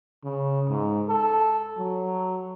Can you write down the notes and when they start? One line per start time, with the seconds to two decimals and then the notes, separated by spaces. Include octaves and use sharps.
0.24 C#3
0.70 G#2
1.09 A4
1.77 F#3